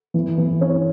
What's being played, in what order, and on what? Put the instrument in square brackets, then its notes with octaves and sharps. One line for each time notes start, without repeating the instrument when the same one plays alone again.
[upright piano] E3
E3
C#4